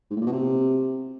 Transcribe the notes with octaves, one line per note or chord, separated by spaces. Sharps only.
G#2
A2
A#2
B2
C3